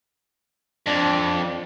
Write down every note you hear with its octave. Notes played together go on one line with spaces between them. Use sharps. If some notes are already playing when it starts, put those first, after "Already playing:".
F2 D4